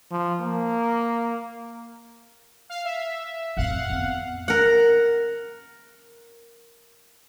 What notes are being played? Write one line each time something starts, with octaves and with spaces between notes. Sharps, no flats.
F3
A#3
F5
E5
A1 F2 F5 F#5
F2 B3
A#4 F#5